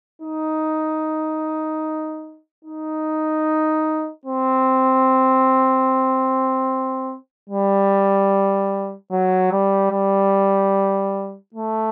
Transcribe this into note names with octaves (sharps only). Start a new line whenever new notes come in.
D#4
D#4
C4
G3
F#3
G3
G3
A3